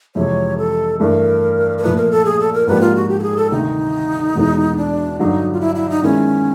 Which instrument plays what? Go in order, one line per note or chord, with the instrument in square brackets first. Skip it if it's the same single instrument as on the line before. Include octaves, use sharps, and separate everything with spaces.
[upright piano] F2 C3 E3 G#3 [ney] C#5
[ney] A4
[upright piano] G2 E3 A3 [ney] A#4
[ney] A#4
[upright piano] A#2 F3 A3 [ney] B4
[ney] A#4
A4
G#4
A4
A#4
[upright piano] G#2 F3 A#3 D4 G4 [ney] B4
[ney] F4
F#4
G4
A4
G#4
A4
[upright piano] D2 C3 D#3 G3 [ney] D#4
[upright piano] E2 B2 G#3 B3 E4
[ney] D4
[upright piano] G2 D3 F#3 [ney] D#4
[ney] F4
E4
E4
D#4
[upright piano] D#3 G#3 B3 E4 [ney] C#4